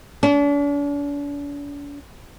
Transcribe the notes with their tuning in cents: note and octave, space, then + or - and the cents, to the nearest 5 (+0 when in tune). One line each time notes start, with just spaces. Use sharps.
D4 -45